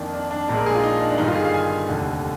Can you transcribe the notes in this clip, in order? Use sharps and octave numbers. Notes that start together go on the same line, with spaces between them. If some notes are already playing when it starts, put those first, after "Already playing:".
Already playing: F2 D#3 A#3 D4
D4
D4
A#1 A#2 G#3 D4
A#4
G#4
F4
D#4
D4
D4
G1 G2 D#3 D#4
F4
G#4
F5
G#5
F1 D#2 D3